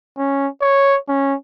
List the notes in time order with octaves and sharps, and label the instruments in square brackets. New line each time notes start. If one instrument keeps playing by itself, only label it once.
[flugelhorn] C#4
C#5
C#4